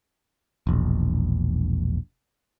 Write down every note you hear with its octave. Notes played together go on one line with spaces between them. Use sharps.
E1 A#1